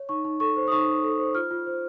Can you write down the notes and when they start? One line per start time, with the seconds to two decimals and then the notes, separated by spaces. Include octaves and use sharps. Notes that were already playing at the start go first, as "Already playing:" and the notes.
Already playing: C#5
0.09 D#4 C#6
0.25 D#4
0.40 A4 C#6
0.56 C5
0.68 D#6
0.72 D#4 C#6
0.88 D#4
1.04 A4
1.19 C5
1.35 F4 F6
1.51 F4
1.67 C5